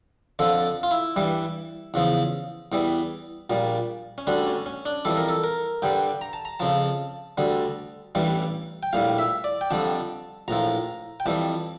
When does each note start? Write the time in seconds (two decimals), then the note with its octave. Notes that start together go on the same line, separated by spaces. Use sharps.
0.39 F2 D3 F3 A4
0.83 F4
0.91 E4
1.16 G2 E3 G3
1.94 E2 C#3 F3
2.72 E2 E3 G3
3.50 A#1 A#2 G3
4.18 C#4
4.27 D2 D3 G3 D4
4.47 C#4
4.66 C#4
4.86 D4
5.05 F2 E3 G3 A4
5.17 A#4
5.29 A4
5.44 A#4
5.82 G2 D3 G3 G5
6.21 A#5
6.33 A5
6.45 A#5
6.60 F2 C#3 F3 A5
7.38 D2 D3 G3
8.15 A1 G2 E3 G3
8.83 G5
8.93 A#1 A2 G3 F5
9.19 E5
9.44 D5
9.61 G5
9.70 F2 D3 G3 A5
10.48 A#1 A2 F3 A#5
11.20 G5
11.26 F2 E3 G3 A5